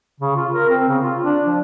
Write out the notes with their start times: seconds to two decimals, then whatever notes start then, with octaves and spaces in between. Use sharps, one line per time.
0.20 C#3
0.36 F4
0.53 A#4
0.69 C4
0.89 C#3
1.02 F4
1.23 D4
1.46 F3